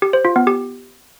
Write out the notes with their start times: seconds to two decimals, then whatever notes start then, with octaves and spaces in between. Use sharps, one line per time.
0.02 G4
0.13 C5
0.25 F4
0.36 B3
0.47 G4